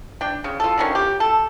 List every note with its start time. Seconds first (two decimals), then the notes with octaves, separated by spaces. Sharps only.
0.21 D4 G5
0.44 C#3
0.60 F4 A4
0.78 D3 D#3 C#4
0.95 G4
1.20 A4